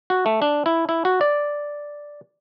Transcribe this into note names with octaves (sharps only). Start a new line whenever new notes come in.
F#4
A3
D4
E4
E4
F#4
D5